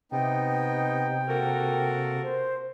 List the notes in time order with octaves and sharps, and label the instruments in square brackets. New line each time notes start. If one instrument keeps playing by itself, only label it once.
[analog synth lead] C3 [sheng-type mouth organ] B3 D#4 [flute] G5
[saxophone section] A#3 A#4 [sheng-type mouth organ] F#4 A4
[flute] C5